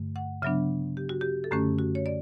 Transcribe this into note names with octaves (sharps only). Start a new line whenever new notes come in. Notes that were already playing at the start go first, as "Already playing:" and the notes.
Already playing: G2 D3 A3
F#5
C#3 F#3 B3 D4 E5
G4
F#4
G4
A4
F#2 D3 A3 C#4 G4
F#4
C#5
D5